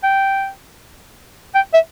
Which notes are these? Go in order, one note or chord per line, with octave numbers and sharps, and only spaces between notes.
G5
G5
E5